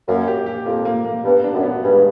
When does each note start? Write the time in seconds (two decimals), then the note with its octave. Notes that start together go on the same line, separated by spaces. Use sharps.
0.08 F#2 A#3
0.27 G4
0.46 G4
0.66 F2 A#3
0.85 A#3
1.05 A#3
1.24 G2 B3
1.44 D4
1.54 F#2
1.63 B3
1.83 G2 G#3